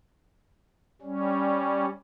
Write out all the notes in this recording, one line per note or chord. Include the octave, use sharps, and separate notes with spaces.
G3 C#4